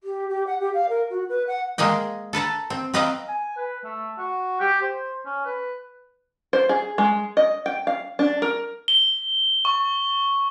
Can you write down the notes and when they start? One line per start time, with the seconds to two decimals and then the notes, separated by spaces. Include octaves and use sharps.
0.03 G4
0.29 G4
0.47 F#5
0.60 G4
0.74 F5
0.89 A#4
1.10 F#4
1.29 B4
1.47 F#5
1.78 G#3 A#3 G#4 D#5 G5
2.33 A4 B4 A5 A#5
2.70 C4
2.94 C4 B4 D#5 F5 G5 A#5
3.28 G#5
3.57 B4
3.84 A3
4.18 F#4
4.60 G4
4.82 C5
5.25 C#4
5.46 B4
6.53 C5
6.69 G#4
6.98 G#3
7.37 D#5
7.66 G5
7.87 F5
8.19 D4
8.42 A#4
8.88 G7
9.65 C#6